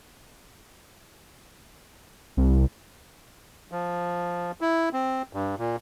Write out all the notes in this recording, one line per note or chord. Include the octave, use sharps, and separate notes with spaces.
C2
F3
E4
C4
G2
A#2